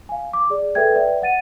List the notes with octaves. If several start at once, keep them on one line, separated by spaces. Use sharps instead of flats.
F5 G#5
D6
G#4 D5
A4 B4 E5 G5 G#6
B4 D5 E5 G5
F#5 A6 D#7